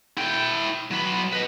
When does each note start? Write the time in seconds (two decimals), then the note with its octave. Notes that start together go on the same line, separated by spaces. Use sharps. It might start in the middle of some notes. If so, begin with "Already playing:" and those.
0.17 E4 G5
0.91 F#3 B4
1.33 B4 D#5